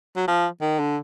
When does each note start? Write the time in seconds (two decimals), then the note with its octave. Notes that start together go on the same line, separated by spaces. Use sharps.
0.16 F#3
0.28 F3
0.61 D#3
0.79 D3